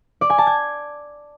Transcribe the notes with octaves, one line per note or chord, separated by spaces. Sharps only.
D5
G#5
A5
G#6